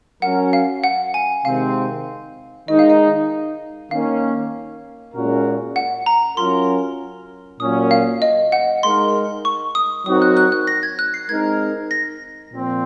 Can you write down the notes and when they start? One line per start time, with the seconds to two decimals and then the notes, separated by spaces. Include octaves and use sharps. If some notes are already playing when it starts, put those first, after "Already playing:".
0.22 F#3 C#4 F#4 A#4 F#5
0.53 F5
0.84 F#5
1.14 G#5
1.45 C3 D#3 G#3 C4 F5
2.68 D#3 G#3 D#4 D#5
2.79 F5
2.90 D#5
3.91 D#3 A#3 C#4 F5
5.14 A#2 G#3 C#4 F#4 A#4
5.76 F#5
6.06 A#5
6.37 F#3 C#4 F4 A#4 C6
7.60 A#2 F#3 A#3 C#4 D#6
7.91 F5
8.22 D#5
8.52 F#5
8.83 G#3 D#4 A#4 C6
9.45 C#6
9.75 D#6
10.06 F#3 C4 D#4 F#4 A#4 D#6
10.22 F#6
10.37 F#6
10.52 F#6
10.67 A#6
10.83 G#6
10.99 F#6
11.14 C7
11.29 G#3 C4 D#4 A#4 G#6
11.91 A#6
12.52 A#2 F3 C4